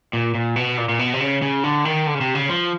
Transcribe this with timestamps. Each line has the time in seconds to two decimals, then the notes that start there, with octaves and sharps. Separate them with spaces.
0.13 A#2
0.35 A#2
0.56 B2
0.77 A#2
0.89 A#2
0.99 B2
1.13 C3
1.20 C#3
1.42 C#3
1.64 D3
1.85 D#3
2.07 D3
2.15 C#3
2.21 C3
2.35 C#3
2.49 F3